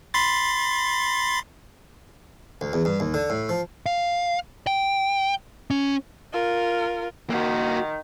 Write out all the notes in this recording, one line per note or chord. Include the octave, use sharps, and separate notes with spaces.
B5 C6 A6
D2
E2
G2
D#2
D3
A2
F3
F5
G5
C#4
F4 A#4
D#3 A#3 F#4